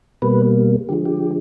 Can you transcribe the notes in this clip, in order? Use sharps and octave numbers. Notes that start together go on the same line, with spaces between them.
B2 G3 A#3 B4
D3 F3 G#3 G4
G4